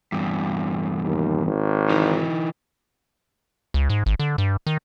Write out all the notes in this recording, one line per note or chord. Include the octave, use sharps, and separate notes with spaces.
E2 G2
D#2
G#1
E3 D#4
C#2
G#2
G#1
D3
G2
D#3